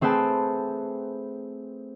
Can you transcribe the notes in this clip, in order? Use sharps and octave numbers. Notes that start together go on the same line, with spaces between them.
A3 C4 G#4 B4 G5 A5